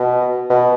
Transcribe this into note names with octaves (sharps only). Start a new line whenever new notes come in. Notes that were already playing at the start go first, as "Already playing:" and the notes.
Already playing: B2
B2